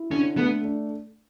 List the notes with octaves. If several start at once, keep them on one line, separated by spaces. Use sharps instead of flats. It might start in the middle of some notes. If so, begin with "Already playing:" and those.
Already playing: E4
D3 C#4
A3 B3
D4